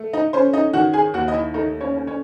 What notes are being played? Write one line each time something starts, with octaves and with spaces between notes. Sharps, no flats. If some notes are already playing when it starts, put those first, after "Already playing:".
Already playing: A3
D#4 D#5
C#4 C5
D#4 D#5
D#3 F#4 F#5
G#4 G#5
D#2 F#4 F#5
D#5
E4 E5
A3 D#4 D#5
C#4 C#5
C#4
C#4 C#5